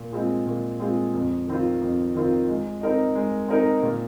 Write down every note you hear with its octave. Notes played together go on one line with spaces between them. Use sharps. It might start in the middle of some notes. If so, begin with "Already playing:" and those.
Already playing: A#2
G#3 C4 F4 G#4
A#2
G#3 C4 F4 G#4
F2
D#3 C4 F4
F2
D#3 C4 F4
G#3
C4 D#4 A#4 D#5
G#3
C4 D#4 A#4 D#5
A#2